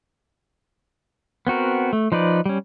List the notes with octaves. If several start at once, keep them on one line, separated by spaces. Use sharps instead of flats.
B3 C4 F#4 A#4
A3
F3 D#4 B4 D5
G3 C#4